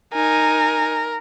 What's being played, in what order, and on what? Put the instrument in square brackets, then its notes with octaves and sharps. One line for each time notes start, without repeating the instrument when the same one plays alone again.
[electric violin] D#4 G#5 [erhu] A#4